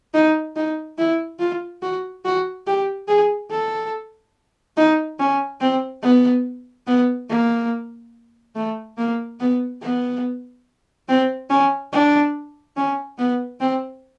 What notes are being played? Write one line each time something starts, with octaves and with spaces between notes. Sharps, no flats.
D#4
D#4
E4
F4
F#4
F#4
G4
G#4
A4
D#4
C#4
C4
B3
B3
A#3
A3
A#3
B3
B3
C4
C#4
D4
C#4
B3
C4